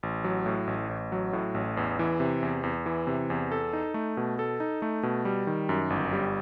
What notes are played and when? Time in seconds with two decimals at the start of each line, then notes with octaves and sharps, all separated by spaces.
0.03 A1
0.24 F#3
0.46 A2
0.67 A1
0.89 A1
1.12 F#3
1.33 A2
1.55 A1
1.77 E2
1.99 E3
2.20 C3
2.43 E2
2.63 E2
2.86 E3
3.07 C3
3.30 E2
3.52 A4
3.73 D#4
3.94 A3
4.17 B2
4.39 A4
4.60 D#4
4.82 A3
5.03 B2
5.25 G3
5.47 D#3
5.69 F#2
5.90 G1
6.13 G3